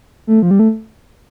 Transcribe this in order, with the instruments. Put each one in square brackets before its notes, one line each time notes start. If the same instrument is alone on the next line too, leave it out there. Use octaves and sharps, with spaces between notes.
[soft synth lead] A3
F3
G3
A3